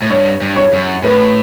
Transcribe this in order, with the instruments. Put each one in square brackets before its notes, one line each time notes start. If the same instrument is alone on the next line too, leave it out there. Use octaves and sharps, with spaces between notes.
[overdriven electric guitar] A2
[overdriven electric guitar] G2 [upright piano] C#5
[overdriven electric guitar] G2
[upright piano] C#5
[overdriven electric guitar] F#2
[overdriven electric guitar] A2 [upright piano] B4